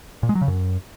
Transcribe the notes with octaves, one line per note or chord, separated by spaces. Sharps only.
A#2
G#3
F#3
C#3
F#2